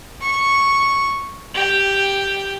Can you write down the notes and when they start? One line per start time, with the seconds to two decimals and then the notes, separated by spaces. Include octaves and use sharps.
0.21 C#6
1.55 G4